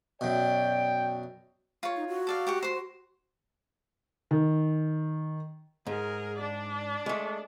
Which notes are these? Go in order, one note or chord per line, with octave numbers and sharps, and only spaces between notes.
F#2 B2 D5 G5
F4 C#5
D#4
F#4
A4 D5 F5
G4 F#5 C#6
C5 C6
D#3
G#2 G#4 A#4
D4 D5
G#3 A3